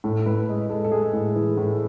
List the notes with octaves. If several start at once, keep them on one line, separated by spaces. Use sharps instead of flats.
A2 A4
A2 B4
G#3
G#3 A4
A4
G#3 G#4
A2
E3
A2